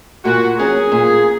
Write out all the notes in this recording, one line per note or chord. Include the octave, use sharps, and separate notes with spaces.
A#2 F#4
F#3 C#4 G#4
A#2